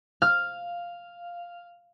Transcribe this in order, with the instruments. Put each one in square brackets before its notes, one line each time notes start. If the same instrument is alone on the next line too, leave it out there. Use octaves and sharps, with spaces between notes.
[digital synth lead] F5 [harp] F6